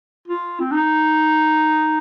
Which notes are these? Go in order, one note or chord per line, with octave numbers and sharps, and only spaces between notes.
F4
C4
D#4